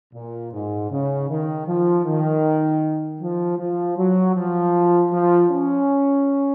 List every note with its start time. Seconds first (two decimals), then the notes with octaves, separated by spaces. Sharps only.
0.14 A#2
0.53 G#2
0.91 C#3
1.29 D#3
1.67 F3
2.05 D#3
3.21 F3
3.58 F3
3.97 F#3
4.35 F3
5.11 F3
5.50 C#4